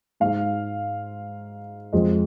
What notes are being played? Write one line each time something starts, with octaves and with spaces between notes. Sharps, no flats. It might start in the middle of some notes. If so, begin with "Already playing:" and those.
G#2 G#3 F5
F2 F3 G#3 D#5